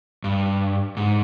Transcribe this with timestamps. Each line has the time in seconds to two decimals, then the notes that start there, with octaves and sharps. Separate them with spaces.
0.24 G2
0.97 G#2